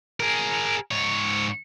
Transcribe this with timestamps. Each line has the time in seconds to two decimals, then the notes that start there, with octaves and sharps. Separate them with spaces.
0.20 G#4 A#4
0.91 G#2 C#5